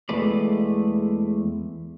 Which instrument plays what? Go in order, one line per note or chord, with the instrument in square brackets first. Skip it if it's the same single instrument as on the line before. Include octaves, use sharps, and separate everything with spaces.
[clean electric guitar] E2 G#3 A3 B4 D5